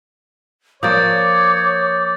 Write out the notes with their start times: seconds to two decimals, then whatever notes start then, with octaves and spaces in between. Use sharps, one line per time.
0.83 F3 A#3 C#5 D5 D6 D#6 G6 A6